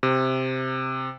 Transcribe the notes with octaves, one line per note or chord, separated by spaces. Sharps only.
C3